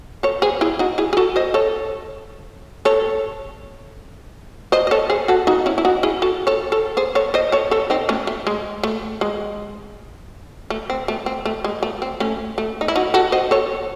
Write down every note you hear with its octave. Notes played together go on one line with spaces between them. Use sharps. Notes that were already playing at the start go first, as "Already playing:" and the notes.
A4 C#5
G#4 C5
E4 G#4
D#4 F#4
E4 G#4
G#4
F#4 A4
C5 D#5
A4 C#5
A4 C#5
C5 D#5
D#5
A4 C#5
G#4 C5
F#4 A4
D#4 F#4
C#4 E4
E4
D#4 F#4
E4 G#4
F#4 A4
A4 C#5
A4 C#5
G#4 C5
A4 C#5
C5 D#5
A4 C#5
A4 C#5
C4 D#4
A3 C#4
A3
G#3
A3
G#3
A3
C4
A3
C4
A3
G#3
A3
C4
A3 C#4
A3
D#4
E4
D#4 F#4
F#4 A4
C5 D#5
A4 C#5